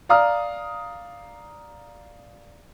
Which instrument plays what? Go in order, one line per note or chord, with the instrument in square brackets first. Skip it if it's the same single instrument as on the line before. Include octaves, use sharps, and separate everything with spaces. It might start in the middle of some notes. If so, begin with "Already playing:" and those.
[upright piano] D5 F5 A#5 D#6 F6